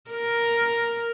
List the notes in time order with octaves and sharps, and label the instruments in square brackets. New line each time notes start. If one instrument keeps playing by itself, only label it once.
[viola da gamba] A#4